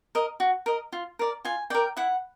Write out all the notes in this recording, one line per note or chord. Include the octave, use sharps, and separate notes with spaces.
A#4 D#5
F#4
A#4 D#5
F4
A#4 D5
F4 G#5
A#4 D5 G5
E4 F#5